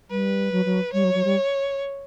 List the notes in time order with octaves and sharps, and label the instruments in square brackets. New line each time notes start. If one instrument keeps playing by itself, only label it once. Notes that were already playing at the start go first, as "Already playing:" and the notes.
[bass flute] G3 [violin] B4
[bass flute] F#3
F#3
[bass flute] G3 [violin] C#5
[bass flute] F#3
F#3
G3